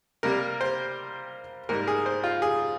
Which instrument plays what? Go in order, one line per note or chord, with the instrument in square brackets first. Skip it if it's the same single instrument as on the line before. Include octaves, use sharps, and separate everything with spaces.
[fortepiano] C3 G3 A#3 A#4
C5
G#2 G3 A#3 A#4
G#4
C5
F4
G#4